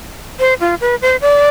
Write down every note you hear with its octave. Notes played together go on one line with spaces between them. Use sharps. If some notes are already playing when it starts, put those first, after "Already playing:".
C5
F4
B4
C5
D5